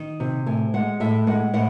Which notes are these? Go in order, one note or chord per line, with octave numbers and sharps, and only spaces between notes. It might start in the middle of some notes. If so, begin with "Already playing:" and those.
Already playing: D#3
C3
A2 G#5
G#3 F#5
A2 E5
G#3 F#5
A2 F#5